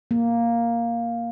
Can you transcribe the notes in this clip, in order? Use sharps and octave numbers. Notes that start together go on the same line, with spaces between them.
A#3